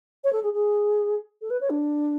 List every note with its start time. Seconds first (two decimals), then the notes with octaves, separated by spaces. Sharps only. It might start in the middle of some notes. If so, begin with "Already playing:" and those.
0.24 C#5
0.32 A4
0.43 G#4
0.53 G#4
1.41 A4
1.50 B4
1.61 C#5
1.70 D4